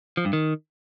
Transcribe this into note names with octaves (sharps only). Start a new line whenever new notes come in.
F3
G2
D#3